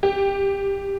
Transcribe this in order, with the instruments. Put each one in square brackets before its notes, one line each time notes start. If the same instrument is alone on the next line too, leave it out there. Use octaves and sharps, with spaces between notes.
[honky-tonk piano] G4